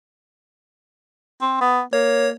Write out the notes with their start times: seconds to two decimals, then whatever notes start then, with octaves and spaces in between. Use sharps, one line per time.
1.42 C4
1.61 B3
1.93 A#3 C#5